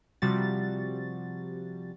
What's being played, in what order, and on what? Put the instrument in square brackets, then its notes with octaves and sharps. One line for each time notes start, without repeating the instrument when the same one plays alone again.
[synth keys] C3 F3 G3 F#4 A6